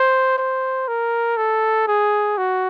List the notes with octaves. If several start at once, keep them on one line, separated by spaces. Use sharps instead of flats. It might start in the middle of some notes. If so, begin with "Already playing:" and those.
Already playing: C5
C5
A#4
A4
G#4
F#4